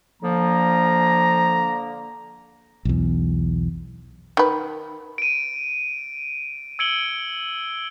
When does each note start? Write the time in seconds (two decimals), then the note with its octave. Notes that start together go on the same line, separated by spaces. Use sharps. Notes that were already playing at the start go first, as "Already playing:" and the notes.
0.23 D3 F3 A#3 A#5
2.85 B1 E2
4.37 D#3 B4
5.18 D7 D#7
6.79 E6 G#6 C#7 D7 F#7 G7